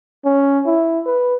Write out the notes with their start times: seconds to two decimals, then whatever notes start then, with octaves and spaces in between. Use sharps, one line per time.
0.25 C#4
0.66 E4
1.06 B4